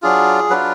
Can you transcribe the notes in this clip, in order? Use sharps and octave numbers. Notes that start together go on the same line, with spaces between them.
F#3 D4 F4 G#4
F#3 D4 F4 B4